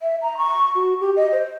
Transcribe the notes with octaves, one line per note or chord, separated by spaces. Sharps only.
E5
A#5
C#6
F#4
G4
D#5
C5